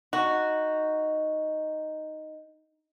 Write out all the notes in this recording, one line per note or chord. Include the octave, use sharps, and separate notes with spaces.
D#4 F#4